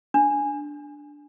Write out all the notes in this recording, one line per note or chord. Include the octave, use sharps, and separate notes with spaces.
D4